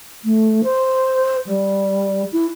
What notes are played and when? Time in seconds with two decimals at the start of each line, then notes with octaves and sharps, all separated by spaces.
0.24 A3
0.63 C5
1.47 G3
2.32 E4